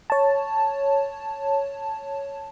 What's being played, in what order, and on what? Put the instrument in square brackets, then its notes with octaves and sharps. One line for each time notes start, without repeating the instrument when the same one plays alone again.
[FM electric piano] C#5 A5